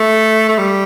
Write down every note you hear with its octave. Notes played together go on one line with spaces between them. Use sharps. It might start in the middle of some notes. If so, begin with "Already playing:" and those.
Already playing: A3
A3
G3